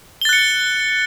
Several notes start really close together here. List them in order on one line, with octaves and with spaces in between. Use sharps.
G7 A6 F#6 C#7